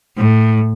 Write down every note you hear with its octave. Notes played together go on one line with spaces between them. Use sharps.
A2